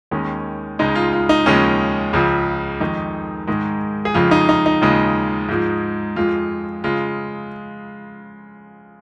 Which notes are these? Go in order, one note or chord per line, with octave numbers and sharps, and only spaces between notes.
D#2 D#3 G#3 C#4
C#2 C#3 G#3 D#4
F4
F4
D#4
D#2 C#3 F3 G#3 C#4
C#2 C#3 F3
F2 D#3 G#3 D#4
G#2 D#3 G#3
G#4
F2 C#3 F3 G#3 F4
D#4
D#4
D#4
D#2 C#3 F3 G#3
G#2 F3 G#3
F2 F3 G#3 F4
C#3 G#3 F4